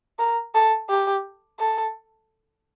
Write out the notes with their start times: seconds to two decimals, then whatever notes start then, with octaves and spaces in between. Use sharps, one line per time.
0.19 A#4
0.55 A4
0.89 G4
1.59 A4